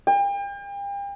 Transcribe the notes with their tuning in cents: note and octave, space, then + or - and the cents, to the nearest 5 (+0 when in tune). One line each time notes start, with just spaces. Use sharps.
G5 +40